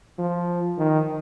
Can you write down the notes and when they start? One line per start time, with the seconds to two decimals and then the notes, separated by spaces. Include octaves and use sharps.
0.19 F3
0.78 D#3